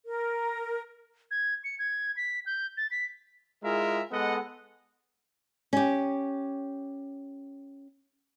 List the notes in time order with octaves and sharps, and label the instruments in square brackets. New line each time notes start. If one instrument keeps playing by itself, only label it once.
[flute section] A#4
[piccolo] G#6
C#7
G#6
B6
G6
A6
B6
[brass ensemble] G#3 E4 F4 G#4 A#4 E5
G#3 B3 A4 D#5 F#5
[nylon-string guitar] C#4 G4